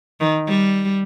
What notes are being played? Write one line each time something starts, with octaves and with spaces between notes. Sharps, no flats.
D#3
G3